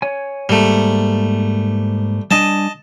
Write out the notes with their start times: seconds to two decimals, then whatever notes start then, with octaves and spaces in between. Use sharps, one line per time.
0.02 C#5 G#5
0.49 G#2 G3 A3 A#3
2.31 G3 D4 D#5 G#5 A5